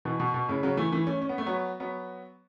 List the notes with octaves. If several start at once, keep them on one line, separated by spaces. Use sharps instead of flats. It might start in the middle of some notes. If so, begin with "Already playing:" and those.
B2 E3
B2
B2
A2 C#3
C#3 F#3
E3 A3
E3 A3
A3 C#4
C#4
B3
A3
F#3 B3
F#3 B3